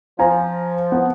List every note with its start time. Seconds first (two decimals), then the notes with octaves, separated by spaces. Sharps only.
0.19 F3 F5 G#5 A#5
0.92 B3